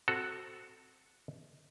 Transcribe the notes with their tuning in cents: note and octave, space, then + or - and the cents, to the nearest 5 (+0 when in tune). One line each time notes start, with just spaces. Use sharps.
C4 +0 F#4 +0 A4 +0